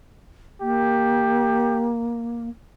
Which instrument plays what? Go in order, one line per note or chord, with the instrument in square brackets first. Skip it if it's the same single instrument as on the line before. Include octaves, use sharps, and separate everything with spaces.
[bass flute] A#3 [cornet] G4